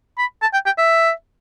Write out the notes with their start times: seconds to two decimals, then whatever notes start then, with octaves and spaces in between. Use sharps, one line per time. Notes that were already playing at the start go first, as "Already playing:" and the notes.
0.18 B5
0.42 A5
0.53 G5
0.66 G5
0.78 E5